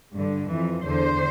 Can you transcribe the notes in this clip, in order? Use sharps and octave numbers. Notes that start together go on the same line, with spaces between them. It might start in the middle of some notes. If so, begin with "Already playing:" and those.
G2 D3
F2 E3
E2 D3 C5